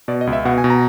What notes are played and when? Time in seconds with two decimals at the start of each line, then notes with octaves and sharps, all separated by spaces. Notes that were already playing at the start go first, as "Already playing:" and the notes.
0.08 B2 D5
0.21 D#5
0.27 C#2
0.33 E5
0.45 B2 F#5
0.58 G#5
0.64 B2
0.70 A#5